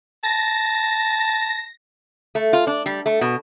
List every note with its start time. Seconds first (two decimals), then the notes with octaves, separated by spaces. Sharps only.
0.24 A5 A#6
2.35 A3
2.53 F4
2.67 D4
2.86 G3
3.06 A3
3.21 B2